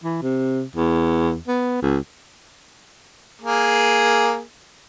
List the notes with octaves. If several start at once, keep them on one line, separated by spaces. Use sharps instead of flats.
E3
C3
E2
B3
C#2
A#3 G#4